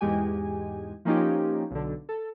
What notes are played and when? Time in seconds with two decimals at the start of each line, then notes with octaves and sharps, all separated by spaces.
0.01 E2 G#2 G#3 G4 G#5
1.05 F3 A#3 C#4 D#4 F4 G4
1.71 B1 D3
2.09 A4